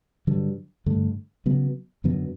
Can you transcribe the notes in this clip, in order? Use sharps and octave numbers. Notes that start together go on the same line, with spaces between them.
G2 D3 F#3
G2 D3 A3
C#3 F#3 B3
F#2 D3 F#3 B3